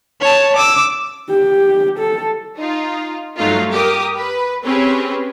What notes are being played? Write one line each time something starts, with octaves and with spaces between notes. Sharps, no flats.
C#5 A5
D6 E6
G4
A4
D#4 F4
G2 F#3 A3 D#4 F4
G4 A#4 D6 D#6
B4
C4 C#4 G4 G#4 B4 C#5